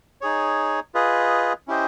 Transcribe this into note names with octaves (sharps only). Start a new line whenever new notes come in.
D#4 G#4 C#5
F4 G#4 B4 D#5
C#4 E4 G4 C5 D#5